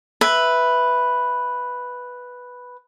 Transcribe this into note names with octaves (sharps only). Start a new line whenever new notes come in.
B4 E5